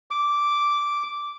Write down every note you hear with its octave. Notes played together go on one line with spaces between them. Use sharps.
D6